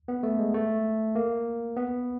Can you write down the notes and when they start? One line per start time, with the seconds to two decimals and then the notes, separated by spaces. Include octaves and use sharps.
0.08 B3
0.23 A3
0.38 G#3
0.54 A3
1.15 A#3
1.76 B3